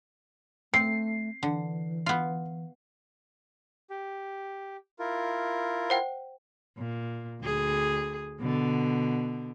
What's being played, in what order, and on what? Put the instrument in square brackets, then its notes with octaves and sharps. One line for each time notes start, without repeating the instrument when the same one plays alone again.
[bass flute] A3 [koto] C4 [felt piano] C7
[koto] D3 [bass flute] E3
[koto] B3 F4
[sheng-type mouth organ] G4
E4 F4 A#4
[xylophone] C5 F#5 G5
[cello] A#2
D2 G#4
B2 D3